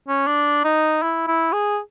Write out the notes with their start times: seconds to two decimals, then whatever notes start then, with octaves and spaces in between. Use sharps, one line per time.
0.08 C#4
0.27 D4
0.64 D#4
1.02 E4
1.27 E4
1.53 G#4